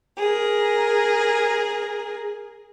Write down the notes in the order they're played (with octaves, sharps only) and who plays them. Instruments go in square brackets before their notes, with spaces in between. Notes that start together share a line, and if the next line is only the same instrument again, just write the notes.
[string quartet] G#4 A#4